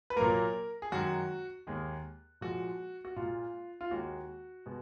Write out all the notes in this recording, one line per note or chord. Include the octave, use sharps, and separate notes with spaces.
B4
A#2 F#3 A#3 A#4
G#4
F#2 D#3 G#3 F#4
D#2 D#3 G#3
A#2 F3 G#3 F#4
F#4
A#2 G#3 F4
F4
D#2 D#3 G#3 F#4
B2 G#3